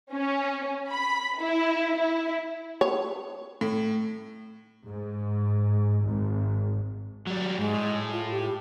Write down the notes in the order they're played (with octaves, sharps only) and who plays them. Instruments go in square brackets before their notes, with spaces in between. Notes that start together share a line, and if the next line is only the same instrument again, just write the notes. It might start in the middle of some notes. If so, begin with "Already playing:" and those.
[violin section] C#4
B5
E4
E4
[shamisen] C#5
[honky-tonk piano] A2
[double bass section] G#2
G#1
[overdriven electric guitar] F#3 G3
[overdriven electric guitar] G#2 [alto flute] G#3
[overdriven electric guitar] A2
[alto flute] F4
G4